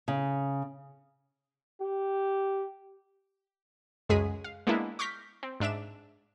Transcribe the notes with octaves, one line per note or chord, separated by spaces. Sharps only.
C#3
G4
C#2 F#2 G#3 G#4 B6 D#7
F5
G#3 A#3 B3 D4 E4
C#6 D6 F6 G6 A#6 B6
C4
G#2 D4 E5 D7 E7